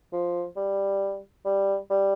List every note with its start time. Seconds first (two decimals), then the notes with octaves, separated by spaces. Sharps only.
0.13 F3
0.56 G3
1.45 G3
1.90 G3